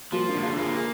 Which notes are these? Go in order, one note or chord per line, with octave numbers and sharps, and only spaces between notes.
F3 G3 A#3
A#3 D4
D3
F4 G#4
A#3 F4 G#4
G#4